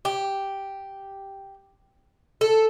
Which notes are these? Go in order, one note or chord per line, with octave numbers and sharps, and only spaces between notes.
G4
A4